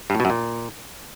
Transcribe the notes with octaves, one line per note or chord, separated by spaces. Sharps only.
G2
A2
B2
F#2
A#2